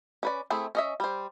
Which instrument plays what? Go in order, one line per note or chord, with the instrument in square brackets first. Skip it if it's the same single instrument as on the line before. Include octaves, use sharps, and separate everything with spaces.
[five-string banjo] C#4 B4 D5
A3 C4 E4 G#4
C#4 D#5 E5
G3 C5